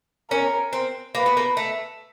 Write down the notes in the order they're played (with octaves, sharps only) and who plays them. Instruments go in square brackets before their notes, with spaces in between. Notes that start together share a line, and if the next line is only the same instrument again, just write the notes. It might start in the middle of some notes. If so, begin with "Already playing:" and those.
[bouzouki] C#4 [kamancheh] A#4
[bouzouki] C4
[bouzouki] A#3 [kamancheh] B4
[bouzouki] B3
A#3
A3